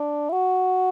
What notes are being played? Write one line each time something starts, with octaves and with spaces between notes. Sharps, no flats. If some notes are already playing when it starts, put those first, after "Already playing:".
Already playing: D4
E4
F#4